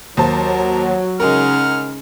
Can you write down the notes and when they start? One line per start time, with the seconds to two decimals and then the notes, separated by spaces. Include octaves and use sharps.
0.17 D#2 F#3 A#4 C5 A5
1.20 C#3 G#3 D#4 A#4 F#5 F6